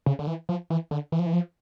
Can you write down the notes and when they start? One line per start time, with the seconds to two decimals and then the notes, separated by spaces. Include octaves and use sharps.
0.06 C#3
0.19 D3
0.27 E3
0.49 F3
0.70 E3
0.91 D3
1.12 E3
1.19 F3
1.26 E3
1.33 F3